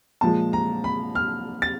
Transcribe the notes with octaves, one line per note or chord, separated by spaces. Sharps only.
A#2 F3 G#3 A5
A#5
B5
F6
A6